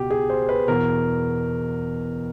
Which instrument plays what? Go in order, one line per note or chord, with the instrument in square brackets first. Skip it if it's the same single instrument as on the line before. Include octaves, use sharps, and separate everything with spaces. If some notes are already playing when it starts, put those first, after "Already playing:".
Already playing: [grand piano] C#2 B2 F#4 G4
G#4
C5
B4
E2 B2 A#4